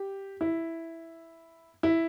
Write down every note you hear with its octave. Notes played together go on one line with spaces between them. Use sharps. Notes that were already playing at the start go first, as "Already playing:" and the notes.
Already playing: G4
E4
E4